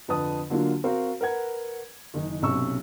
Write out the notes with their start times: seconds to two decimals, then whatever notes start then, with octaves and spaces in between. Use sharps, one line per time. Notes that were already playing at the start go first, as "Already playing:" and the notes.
0.08 F2 D3 B4 A5 D#6
0.50 D3 F#3 A#3 D4 F4
0.84 C4 F#4 A#4 C5 F5
1.21 A#4 B4 F#5 G#6
2.14 F#1 D#3 D#4
2.42 B1 C3 C#4 C#6 E6